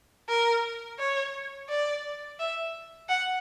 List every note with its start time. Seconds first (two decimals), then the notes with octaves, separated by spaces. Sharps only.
0.29 A#4
0.99 C#5
1.69 D5
2.39 E5
3.09 F#5